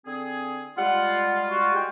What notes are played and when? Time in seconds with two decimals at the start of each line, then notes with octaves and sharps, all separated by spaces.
0.06 D3 C4 G#4
0.78 G3 G#3 F4 F#5
1.51 F#4
1.74 G#3 G5